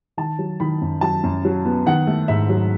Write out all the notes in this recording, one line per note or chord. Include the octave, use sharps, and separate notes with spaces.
D#3 A5
F#3
D#3 B5
F#2
F#3 A5
F#2
F#3
B3
D#3 F#5
A3
G#2 E5
F#3